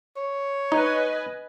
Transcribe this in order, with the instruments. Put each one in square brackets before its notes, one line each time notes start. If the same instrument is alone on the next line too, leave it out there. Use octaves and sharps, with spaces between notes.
[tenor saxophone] C#5
[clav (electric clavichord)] D#4 [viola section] B4 D#5 G#5